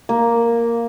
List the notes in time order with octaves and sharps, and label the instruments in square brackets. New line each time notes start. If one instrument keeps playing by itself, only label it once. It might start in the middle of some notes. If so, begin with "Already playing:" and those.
[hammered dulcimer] A#3